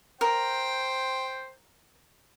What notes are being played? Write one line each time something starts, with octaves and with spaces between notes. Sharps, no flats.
A#4 C5 G5